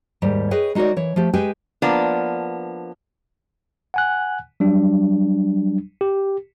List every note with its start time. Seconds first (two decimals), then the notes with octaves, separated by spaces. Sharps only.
0.22 D#2 G#2 G3
0.51 G#4 B4 C#5 D#5 G5
0.75 G#3 D#4 F#4 A#4 C#5 D5
0.97 E3 C#5
1.16 F3 A3 G4
1.34 G#3 G4 B4 G5 G#5
1.82 F3 A#3 B3 D4
3.94 F#5 G#5 F#6
4.60 F#3 G3 D4
6.01 G4